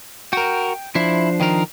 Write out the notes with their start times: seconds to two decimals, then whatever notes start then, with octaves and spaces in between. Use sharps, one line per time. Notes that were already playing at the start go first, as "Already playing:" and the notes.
0.33 F#4 A#4 G5
0.95 F3 D4 E4 C5
1.41 D#3 A#4